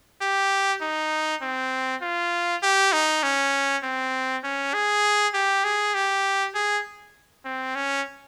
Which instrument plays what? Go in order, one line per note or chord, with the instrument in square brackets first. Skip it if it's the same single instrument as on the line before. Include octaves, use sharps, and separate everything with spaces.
[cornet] G4
D#4
C4
F4
G4
D#4
C#4
C4
C#4
G#4
G4
G#4
G4
G#4
C4
C#4